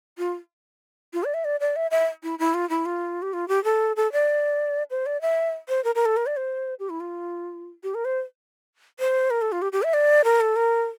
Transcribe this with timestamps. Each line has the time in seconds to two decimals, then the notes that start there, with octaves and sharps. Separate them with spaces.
0.18 F4
1.14 F4
1.24 D5
1.34 E5
1.45 D5
1.60 D5
1.76 E5
1.91 E5
2.23 E4
2.39 E4
2.54 F4
2.70 E4
2.86 F4
3.22 G4
3.33 F4
3.48 G4
3.64 A4
3.96 A4
4.12 D5
4.90 C5
5.06 D5
5.21 E5
5.69 C5
5.84 A#4
5.95 A#4
6.06 A4
6.17 A#4
6.26 D5
6.37 C5
6.79 G4
6.90 E4
7.00 F4
7.83 G4
7.95 A#4
8.05 C5
9.00 C5
9.30 A#4
9.42 A4
9.52 F4
9.62 G4
9.72 G4
9.83 E5
9.94 D5
10.24 A#4
10.41 A4
10.56 A#4